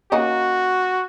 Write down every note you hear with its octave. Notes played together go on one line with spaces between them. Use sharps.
A#3 C#4 D#4 F#4